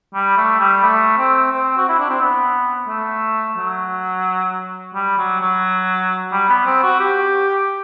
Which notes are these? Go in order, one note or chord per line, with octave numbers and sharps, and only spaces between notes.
G3
A3
G3
A3
C4
C4
F#4
E4
D4
C4
B3
A3
F#3
G3
F#3
F#3
G3
B3
C4
F#4
G4